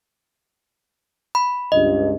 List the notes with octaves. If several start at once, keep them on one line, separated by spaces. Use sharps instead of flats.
B5
C#2 G2 D#5